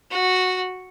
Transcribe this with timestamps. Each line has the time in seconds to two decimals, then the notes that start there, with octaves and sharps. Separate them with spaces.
0.11 F#4